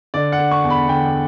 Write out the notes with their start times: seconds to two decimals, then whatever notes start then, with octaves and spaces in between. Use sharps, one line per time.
0.14 D3 D5
0.32 F#5
0.39 D3
0.51 C#6
0.64 E2
0.70 B5
0.89 D3 G5